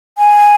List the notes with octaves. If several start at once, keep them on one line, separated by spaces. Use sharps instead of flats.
G#5